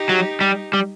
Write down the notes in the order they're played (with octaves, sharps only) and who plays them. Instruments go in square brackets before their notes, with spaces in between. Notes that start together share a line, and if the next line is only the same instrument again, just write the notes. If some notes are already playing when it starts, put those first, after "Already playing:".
Already playing: [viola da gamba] D#4 G4
[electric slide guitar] F#3
G3
G3